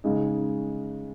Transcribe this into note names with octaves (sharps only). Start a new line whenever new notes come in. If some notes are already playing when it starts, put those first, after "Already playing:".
C#3 G#3 D#4